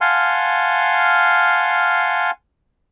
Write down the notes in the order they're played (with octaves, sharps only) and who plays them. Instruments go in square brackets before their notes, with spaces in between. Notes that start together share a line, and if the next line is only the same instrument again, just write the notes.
[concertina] F5 F#5 G#5 A5 C6 F6